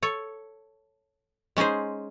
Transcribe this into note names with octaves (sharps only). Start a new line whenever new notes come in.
A4 C#5
G#3 C#4 D#4 G#4 C5